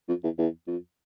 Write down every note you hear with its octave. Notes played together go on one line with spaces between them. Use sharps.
F2
E2
E2
F2